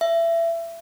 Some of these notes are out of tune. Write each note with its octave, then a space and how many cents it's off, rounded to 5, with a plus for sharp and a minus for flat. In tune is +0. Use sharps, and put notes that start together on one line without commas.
E5 +25